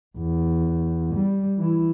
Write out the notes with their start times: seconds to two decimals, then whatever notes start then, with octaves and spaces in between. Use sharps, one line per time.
0.18 E2
1.15 G3
1.58 E3 E4